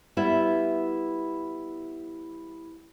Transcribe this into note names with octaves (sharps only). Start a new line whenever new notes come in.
G3 B3 E4 E5